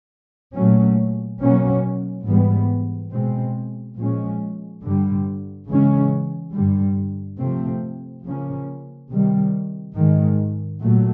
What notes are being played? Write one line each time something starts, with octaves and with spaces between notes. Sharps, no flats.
A#2 F#3 A3 C#4
B2 F#3 A#3 C#4
G#2 E3 G3 B3
B2 G#3 C4
A#2 F3 G#3 C#4
G2 D3 G3
C#3 E3 G#3 C#4
G2 D3 G3
C3 F3 A3 C4
C#3 F3 A#3 C#4
C3 D#3 G3
G#2 D#3 G#3
A#2 F#3 A3